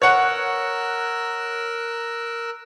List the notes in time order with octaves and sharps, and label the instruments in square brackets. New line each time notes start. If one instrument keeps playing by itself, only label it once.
[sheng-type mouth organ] A#4 E6 F#6 [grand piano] C#5 F#5